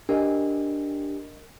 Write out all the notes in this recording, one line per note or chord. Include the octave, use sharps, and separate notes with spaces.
D4 G4 A#4 D#5 G#5